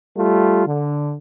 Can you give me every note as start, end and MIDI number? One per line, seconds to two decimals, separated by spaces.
0.17 0.64 55
0.17 0.64 57
0.17 0.64 65
0.66 1.14 50